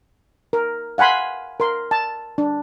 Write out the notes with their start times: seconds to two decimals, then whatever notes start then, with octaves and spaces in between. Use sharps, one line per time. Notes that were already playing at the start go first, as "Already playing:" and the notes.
0.53 A#4
0.98 F5 F#5 G#5 B5 C6
1.60 A#4 C6
1.91 A5
2.38 D4